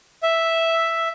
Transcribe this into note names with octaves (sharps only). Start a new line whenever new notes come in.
E5